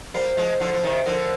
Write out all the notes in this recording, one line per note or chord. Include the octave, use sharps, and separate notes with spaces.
G3 A#3 C5
F3 G#3
D3 F3 C5
F3
C3 D#3
D3 F3 A#4